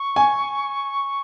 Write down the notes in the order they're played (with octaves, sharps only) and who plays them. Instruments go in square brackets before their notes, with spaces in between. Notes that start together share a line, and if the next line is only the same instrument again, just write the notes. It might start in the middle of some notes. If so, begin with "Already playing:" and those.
Already playing: [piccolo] C#6
[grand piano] G#5